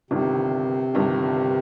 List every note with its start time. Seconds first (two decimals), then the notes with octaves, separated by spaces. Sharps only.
0.11 G1 G2 C3 D#3
0.94 G1 G2 D#3